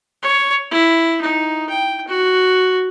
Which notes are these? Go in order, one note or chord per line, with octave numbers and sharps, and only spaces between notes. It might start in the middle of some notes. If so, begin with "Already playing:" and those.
C#5
E4
D#4
G5
F#4